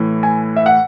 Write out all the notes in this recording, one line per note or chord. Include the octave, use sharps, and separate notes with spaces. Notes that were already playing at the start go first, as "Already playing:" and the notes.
Already playing: A2 E3
G#5
E5
F#5